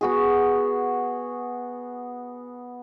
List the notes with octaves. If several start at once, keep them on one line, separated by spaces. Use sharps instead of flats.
B3 F#4 G#4